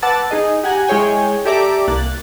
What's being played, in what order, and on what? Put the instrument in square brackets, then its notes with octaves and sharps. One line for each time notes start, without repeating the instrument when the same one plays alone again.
[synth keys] B4 F#5 A5 D6 E6 A6
D#4 G#4 D#5
G4 F#5 G#5 A#5
G#3 E4 G#4 C#5 G5 G#5
G4 A4 D5 E5 A#5 D6
C2 A#3 F#6 A6